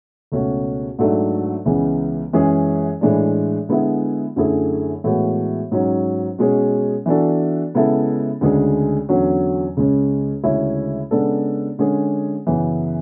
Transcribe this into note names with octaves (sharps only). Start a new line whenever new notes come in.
C#2 B2 A3 C#4 F#4
G#2 F#3 A3 D4 A4
C#2 C#3 E3 G#3 B3
F#2 E3 G#3 C#4 G#4
A2 E3 G#3 D4
D3 G#3 B3 E4 G#4
F#2 D3 A3 E4 G#4
A2 E3 G#3 B3 F#4
G#2 F#3 C#4
B2 G#3 C#4 G#4
E3 B3 D4 F#4 A4
C#3 G#3 B3 E4 A4
D2 C#3 G#3 D4 G#4
E2 D3 F#3 C#4
C#2 C#3 G#3 C#4
D2 C#3 G#3 C#4 E4
C#3 G#3 B3 D4 A4
D3 G#3 C#4 G#4
F#2 C#3 E3 B3